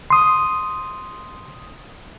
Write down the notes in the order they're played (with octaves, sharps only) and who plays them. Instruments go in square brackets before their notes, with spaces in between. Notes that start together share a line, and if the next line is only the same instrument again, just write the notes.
[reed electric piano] C6 D#6